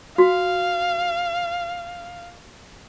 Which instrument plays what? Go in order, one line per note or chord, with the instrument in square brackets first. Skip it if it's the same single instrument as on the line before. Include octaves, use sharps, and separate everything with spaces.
[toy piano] F#4 [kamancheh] F5